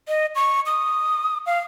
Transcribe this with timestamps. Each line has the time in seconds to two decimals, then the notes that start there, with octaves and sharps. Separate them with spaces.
0.08 D#5
0.35 C#6
0.66 D#6
1.46 F5